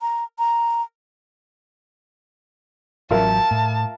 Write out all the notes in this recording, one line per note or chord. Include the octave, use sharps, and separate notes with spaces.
A#5
A#5
A1 F#3 F4 A#4 E5 A5
A2